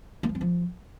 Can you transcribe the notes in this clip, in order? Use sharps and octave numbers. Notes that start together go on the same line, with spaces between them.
A#3
F3
C4
F3